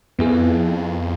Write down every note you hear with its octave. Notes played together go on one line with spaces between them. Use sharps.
F2 B3 E4 G#4